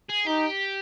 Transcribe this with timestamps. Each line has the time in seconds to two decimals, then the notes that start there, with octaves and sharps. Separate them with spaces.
0.09 G#4
0.26 D#4 G4